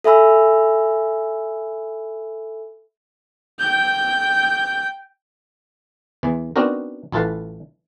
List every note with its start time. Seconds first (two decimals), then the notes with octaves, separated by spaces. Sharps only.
0.04 A4 E5 G#5 B5 E6
3.59 G5 G6
6.23 E2 E3
6.56 B3 C4 D4 D#4 F#4 A#4
7.12 A1 E4 F4 A4 B4 F5